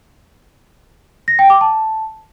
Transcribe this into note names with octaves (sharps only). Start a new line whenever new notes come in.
A#6
G5
D6
A5